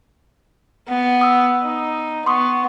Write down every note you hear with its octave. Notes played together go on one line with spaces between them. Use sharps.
B3
D#6 E6
D#4
B3 C6 C#6 D#6